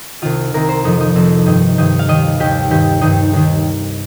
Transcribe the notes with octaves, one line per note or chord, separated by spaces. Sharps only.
C2 C3 D#3 F4
C2 C3 D#3 A#4
C5
F2 C3 F3 D#4
D#4
F2 C3 F3 C4
G2 D#3 D#4
G2 D#3 D#4
F5
D#2 D#3 D#5
D#2 D#3 G4
G2 D#3 G4
G2 D#3 D#4
D#2 D#3